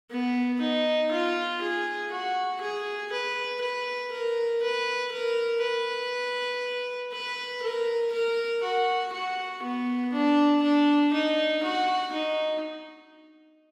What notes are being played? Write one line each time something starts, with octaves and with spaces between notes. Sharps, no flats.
B3
D#4
F4
G#4
F#4
G#4
B4
B4
A#4
B4
A#4
B4
B4
A#4
A#4
F#4
F#4
B3
D4
D4
D#4
F#4
D#4